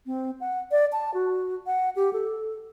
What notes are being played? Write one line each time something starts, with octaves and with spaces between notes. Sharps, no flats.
C4
F#5
D5
A5
F#4
F#5
G4
A4